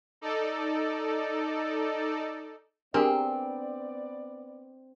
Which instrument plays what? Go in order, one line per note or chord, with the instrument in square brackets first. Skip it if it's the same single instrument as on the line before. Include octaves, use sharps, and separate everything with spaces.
[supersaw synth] D#4 A4 D5
[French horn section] B3 D5 [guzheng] C4 [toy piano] D4 [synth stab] G4 G#4 A#4